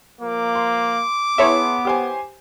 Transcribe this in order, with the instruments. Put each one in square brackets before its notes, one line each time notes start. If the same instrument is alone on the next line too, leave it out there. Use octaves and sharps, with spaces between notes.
[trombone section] F3 A#3 [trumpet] D6
[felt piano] C6
[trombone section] B3 [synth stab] E4 C#5 E5 [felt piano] G#4 A5 C6
[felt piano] G4 C5 G#5